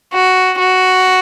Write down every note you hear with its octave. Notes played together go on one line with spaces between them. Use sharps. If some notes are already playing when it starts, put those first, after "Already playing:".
F#4
F#4